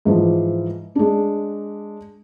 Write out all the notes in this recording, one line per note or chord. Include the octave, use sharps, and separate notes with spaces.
G#2 E3 F3
G#3 D4